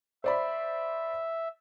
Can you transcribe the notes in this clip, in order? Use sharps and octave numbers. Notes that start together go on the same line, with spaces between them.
C5 D5 E5 B5